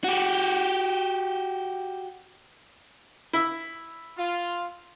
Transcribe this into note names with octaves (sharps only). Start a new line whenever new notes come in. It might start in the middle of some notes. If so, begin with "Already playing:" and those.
F#4 G4
E4
F4